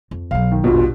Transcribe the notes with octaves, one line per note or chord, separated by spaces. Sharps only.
F2
B1 F#3 F5
D#3
A#1 E2 G2 B2 F4